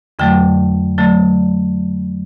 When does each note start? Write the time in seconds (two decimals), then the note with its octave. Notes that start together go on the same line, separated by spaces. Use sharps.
0.19 F2 D3 F#3 A3 G5
0.98 D3 F#3 A3